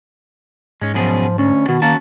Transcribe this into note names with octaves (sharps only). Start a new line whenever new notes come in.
G#2 G#3 C#4
F#2 B2 F3 G#4
D2 C#4
B2 D#3 F#4
A#3 C#4 F#4 A5